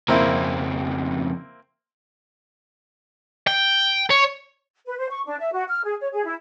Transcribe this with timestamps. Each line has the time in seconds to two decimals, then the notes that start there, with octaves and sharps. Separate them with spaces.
0.08 F2 C#3 A#3 C4 E4
3.47 G5
4.10 C#5
4.86 B4
4.98 C5
5.10 C#6
5.26 D4
5.40 E5
5.53 F#4
5.69 F6
5.84 G#4
6.01 C#5
6.13 G#4
6.25 E4